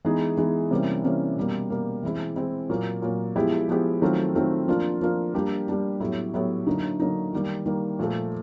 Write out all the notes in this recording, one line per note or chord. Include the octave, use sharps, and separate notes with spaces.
E3 G#3 B3 D#4 G#4
E3 G#3 B3 D#4 G#4
C3 E3 G3 A#3 C#4
C3 E3 G3 A#3 C#4
B2 G3 A#3
B2 G3 A#3
E3 G#3 C4 E4
E3 G#3 C4 E4
A#2 F#3 A#3
A#2 F#3 A#3
F3 G#3 B3 E4 G4
F3 G#3 B3 E4 G4
D#3 F#3 A3 C4 F4
D#3 F#3 A3 C4 F4
F3 A#3 D4 F4
F3 A#3 D4 F4
G3 A#3 D4 G4
G3 A#3 D4 G4
A2 F#3 B3 E4 G4
A2 F#3 B3 E4 G4
D3 F#3 A#3 D#4
D3 F#3 A#3 D#4
D#3 G3 A#3
D#3 G3 A#3
A#2 F3 A3